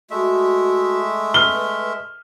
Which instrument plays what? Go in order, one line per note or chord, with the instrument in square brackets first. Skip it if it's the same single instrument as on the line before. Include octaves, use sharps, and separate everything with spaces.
[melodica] G#3 A3 E5 [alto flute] F#4
[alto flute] B4 [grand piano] F6 G7